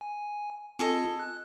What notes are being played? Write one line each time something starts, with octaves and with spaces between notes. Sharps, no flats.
G#5
C4 F4 G#4 A4 D#5
F#6